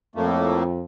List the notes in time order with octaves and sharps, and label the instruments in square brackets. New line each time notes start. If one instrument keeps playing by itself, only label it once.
[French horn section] F2 [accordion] A2 A3 A#3